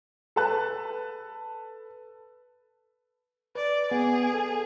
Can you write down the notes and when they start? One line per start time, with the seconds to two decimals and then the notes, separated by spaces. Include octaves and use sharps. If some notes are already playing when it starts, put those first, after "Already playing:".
0.36 A4 B4 A5 F#6
3.55 B4 D5
3.91 B3 G#4
4.34 A4